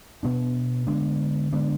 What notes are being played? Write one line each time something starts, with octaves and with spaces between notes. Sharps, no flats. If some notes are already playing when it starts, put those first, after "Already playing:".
B2 B3 D4
D3 G#3 B3 D4
D3 G#3 B3 D4